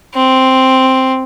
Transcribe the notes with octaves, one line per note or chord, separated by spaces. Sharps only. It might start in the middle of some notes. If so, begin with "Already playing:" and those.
C4